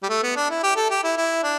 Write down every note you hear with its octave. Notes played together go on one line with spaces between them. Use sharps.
G3
A3
B3
D4
E4
G4
A4
G4
E4
E4
D4